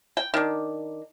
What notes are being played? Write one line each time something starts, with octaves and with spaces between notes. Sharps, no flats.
G5
D#3 D4